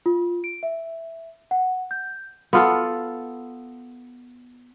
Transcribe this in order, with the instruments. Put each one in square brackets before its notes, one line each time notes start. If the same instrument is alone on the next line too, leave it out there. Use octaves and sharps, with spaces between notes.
[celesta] F4
D7
E5
F#5
G6
[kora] B3 F4 A4